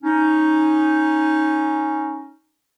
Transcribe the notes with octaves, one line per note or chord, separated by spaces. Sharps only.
C#4 D#4